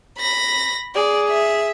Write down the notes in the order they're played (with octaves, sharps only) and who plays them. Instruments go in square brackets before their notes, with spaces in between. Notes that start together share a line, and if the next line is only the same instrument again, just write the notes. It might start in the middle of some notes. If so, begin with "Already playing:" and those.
[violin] B5 A#6
[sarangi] G#4 [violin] D5
[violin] E5